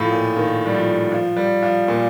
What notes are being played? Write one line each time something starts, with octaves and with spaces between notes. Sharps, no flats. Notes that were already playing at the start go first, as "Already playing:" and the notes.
Already playing: A2 F3
A#2
D#3
G3
F3
F3
G3
F3
A#2